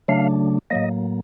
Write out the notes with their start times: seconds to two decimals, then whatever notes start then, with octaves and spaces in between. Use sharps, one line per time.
0.08 C#3 F#3 A3 D4 F5
0.70 A2 F#3 A#3 D#5